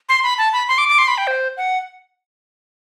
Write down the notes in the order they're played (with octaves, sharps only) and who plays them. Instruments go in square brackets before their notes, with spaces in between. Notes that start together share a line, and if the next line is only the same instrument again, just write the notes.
[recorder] C6
B5
A5
B5
C6
D6
D6
C6
B5
G5
C5
F#5